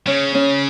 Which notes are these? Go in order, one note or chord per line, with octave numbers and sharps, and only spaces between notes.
C#3 C#4
C#4